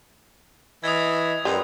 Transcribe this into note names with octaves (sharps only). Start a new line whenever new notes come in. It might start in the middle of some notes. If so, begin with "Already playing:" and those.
E3 D#5 D#6 G#6
F#2 G3 G#3 B4